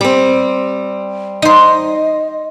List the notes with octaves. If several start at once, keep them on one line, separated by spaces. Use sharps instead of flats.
G3 C4
D#4 C5 D#5